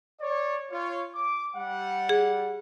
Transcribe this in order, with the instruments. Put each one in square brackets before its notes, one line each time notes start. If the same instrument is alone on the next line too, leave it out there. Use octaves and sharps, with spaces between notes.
[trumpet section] C#5 D5
F4 C#5
D6
G3 F#5
[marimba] G#4